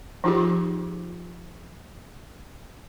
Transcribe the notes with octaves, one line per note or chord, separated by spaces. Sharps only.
F3 D#4 F4 G4 G#4